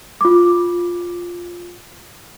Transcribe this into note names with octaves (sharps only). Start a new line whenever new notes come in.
F4 D6